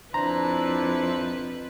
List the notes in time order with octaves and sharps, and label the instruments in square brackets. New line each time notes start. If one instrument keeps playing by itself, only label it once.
[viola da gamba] F2 B4 [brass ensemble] D4 E4 [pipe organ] C5 [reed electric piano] A#5